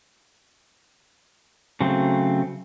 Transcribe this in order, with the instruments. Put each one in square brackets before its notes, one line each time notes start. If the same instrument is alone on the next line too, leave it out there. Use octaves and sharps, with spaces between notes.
[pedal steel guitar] C#3 F#3 A3 C4